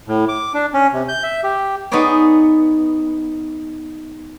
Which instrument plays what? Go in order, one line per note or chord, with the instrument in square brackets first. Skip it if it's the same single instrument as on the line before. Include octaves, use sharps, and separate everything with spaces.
[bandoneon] A2
D6
D4
C#4
C3
G6
E5
G4
[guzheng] B3 D#4 G#4 B4 C#5 D5